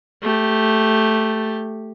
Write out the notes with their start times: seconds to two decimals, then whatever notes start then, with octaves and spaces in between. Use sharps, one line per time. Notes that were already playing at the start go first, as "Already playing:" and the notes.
0.22 A3 G4